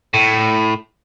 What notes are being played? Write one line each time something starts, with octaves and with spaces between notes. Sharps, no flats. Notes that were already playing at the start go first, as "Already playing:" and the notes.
A2